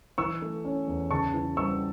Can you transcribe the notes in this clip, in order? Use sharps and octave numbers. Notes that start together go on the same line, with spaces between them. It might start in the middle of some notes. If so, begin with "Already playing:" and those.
E3 C#6 E6
A3
C#4
E2
C#3 A5 C#6
E3
G3 C#6 E6